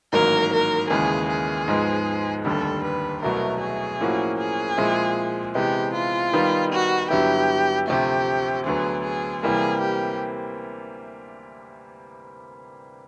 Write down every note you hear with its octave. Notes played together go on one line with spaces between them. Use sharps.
A1 G#2 D#3 F#3 A#3 A#4
A#4
D#2 C#3 E3 G#3 G#4
G#4
G#2 F3 G#3 B3
F1 D#2 D3 G3 A4
B4
C2 B2 F#3 A3 A#4
G#4
A2 F3 A#3 C#4 F#4
G#4
A#2 F3 G#3 C4 E4
C3 E3 G#3 B3 G4
F4
D#3 G3 B3 D#4
F#4
G2 D3 F#3 B3 E4 G4
D2 C3 F3 A3 G4
D2 D3 F#3 B3 G#4
G#4
C3 E3 G3 A#3 G#4
G4